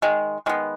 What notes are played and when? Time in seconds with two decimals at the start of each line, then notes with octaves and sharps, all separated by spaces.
0.02 D#3 G#3
0.46 D#3 G#3 B3